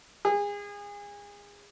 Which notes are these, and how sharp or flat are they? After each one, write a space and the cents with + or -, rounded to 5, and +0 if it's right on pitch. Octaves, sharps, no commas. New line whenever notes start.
G#4 -30